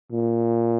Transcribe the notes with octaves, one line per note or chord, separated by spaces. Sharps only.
A#2